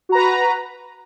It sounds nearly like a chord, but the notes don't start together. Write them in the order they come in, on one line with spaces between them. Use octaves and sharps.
F#4 A#5 B4